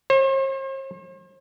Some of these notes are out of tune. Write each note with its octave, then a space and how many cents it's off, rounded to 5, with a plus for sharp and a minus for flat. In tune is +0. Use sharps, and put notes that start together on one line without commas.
C5 +45